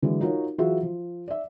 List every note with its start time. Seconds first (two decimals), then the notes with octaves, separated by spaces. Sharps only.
0.02 D3 E3 F#3 G#3
0.21 D#4 F4 F#4 A#4 C#5
0.58 E3 F#3 F4 F#4 G#4 E5
0.83 F3
1.28 D5 E5